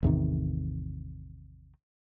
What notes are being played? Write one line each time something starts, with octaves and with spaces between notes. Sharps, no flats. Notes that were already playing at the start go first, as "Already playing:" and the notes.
A1 E2 C3 D#3